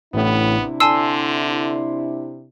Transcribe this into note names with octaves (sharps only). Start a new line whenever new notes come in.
A1 A2 C3 B3 D4 E4
D3 G#5 A5 C6 E6